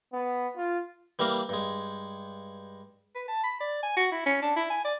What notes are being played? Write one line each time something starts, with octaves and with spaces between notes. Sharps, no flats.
B3
F4
E3 G3 A#3 A#4 F5
G2 G#3
B4
A5
B5
D5
G#5
F#4
E4
C#4
D4
E4
G#5
D5